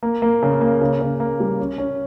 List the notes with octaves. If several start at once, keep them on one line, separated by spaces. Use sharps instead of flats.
A#3
A#3
C#3
A#3
C#3
C#3
A#3
G3
C#4
C#4